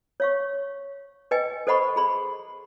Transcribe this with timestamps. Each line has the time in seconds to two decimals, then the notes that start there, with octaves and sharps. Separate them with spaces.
0.20 C#5 F5 C#6
1.31 B4 D#5 G5 G#5
1.67 A4 C5 D#5 F#5 B5 C#6
1.96 G#4 B5 C6